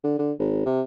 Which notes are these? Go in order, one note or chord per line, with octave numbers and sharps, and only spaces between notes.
D3
D3
G#1
C3